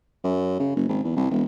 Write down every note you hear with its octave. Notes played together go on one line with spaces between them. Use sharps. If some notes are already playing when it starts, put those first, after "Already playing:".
F#2
C#3
F#1
G#1
E2
C2
E1